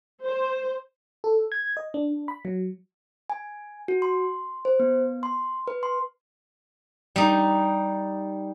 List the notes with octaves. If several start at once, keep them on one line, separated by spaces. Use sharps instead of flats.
C5
A4
G#6
D#5
D4
B5
F#3
G#5
F#4
C6
C5
B3
C6
B4
C6
G3 D#4